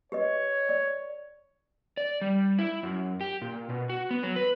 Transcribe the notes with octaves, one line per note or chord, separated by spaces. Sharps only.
G4 B4 C#5 D#5
D5
D5
G3
E4
F#2
G4
A#2
B2
F#4
B3
F#3
B4